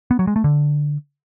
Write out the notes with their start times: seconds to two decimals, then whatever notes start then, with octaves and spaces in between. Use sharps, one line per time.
0.11 B3
0.19 F#3
0.27 G#3
0.36 A3
0.44 D3